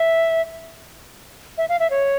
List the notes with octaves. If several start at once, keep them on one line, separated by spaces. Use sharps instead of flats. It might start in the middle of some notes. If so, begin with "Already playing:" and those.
Already playing: E5
E5
F5
E5
C#5